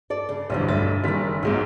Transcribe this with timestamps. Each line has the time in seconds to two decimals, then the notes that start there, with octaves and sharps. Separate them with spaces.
0.10 A4 D5
0.29 C#3
0.50 B1 G2 D3 E3 F3 G3
0.69 B1 G2 A3 E5 A6
1.04 F#1 D#3 G3 A#4 B6
1.43 B1 E2 G#2 B2 G#3 D#4